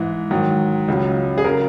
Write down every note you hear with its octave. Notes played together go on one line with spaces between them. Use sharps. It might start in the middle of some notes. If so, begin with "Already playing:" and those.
Already playing: G#2 E3
G#2 D#3 F#3
C#2 C#3 F#3
G#4
C#3 F#3 A#4